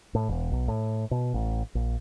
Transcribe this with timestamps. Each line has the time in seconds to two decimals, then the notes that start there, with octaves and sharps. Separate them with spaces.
0.15 A2
0.29 E1
0.52 B1
0.68 A2
1.11 B2
1.34 A1
1.75 A#1